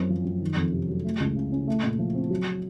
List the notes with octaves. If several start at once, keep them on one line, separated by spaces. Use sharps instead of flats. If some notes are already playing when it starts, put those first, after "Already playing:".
Already playing: F#2 C4
F3
F#2
D#3
F2
C3
F#3
A3
C#2
C#3
C#4
A3
A#2
F3
C4
F#3